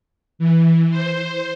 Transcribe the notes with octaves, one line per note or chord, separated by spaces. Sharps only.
E3
C5